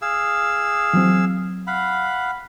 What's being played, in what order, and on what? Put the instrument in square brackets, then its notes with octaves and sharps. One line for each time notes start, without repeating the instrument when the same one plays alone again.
[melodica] G#4 F5 E6
[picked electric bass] E3 F#3 C4
[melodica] F5 F#5 B5